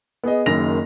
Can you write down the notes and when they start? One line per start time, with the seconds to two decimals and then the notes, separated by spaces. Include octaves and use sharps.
0.23 B3 G#4 D#5
0.46 F#1 F#2 D#3 A#6 F7